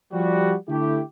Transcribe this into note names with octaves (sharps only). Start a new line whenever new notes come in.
F3 G3 F#4
D3 A3 E4 G4